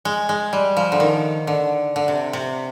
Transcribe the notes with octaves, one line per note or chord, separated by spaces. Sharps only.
G#3
G#3
G3
F3
D3
D#3
D3
D3
C3
C3